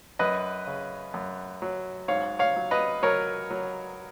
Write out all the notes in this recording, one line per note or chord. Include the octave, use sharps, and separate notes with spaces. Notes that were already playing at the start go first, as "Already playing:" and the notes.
F#2 B4 D#5
C#3
F#2
F#3
G#2 C#5 F5
C#5 F5
F#3
B4 D#5
F#3 A#4 C#5
F#3